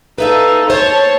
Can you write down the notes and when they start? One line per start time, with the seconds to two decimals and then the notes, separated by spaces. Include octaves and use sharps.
0.18 D#4 A4 B4 E5 F5
0.70 C5 C#5 A5